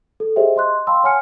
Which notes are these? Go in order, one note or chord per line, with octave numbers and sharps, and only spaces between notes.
A4
G4 G#4 C5 D#5 E5 G5
D#5 C6 F#6
F5 G5 A5 B5 C6 E6
C#5 F#5 G#5 F6 C#7